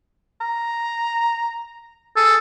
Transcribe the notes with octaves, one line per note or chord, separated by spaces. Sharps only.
A#5
G#4 A4